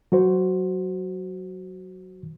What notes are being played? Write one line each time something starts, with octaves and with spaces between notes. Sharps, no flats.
F#3 F#4 C5